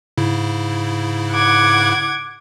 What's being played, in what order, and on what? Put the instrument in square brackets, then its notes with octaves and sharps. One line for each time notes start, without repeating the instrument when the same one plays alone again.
[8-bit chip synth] G#2 C#3 E4
[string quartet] F#5 D6 G#6